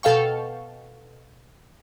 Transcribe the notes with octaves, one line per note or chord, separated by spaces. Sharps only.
B2 A4 F5 G5 C#6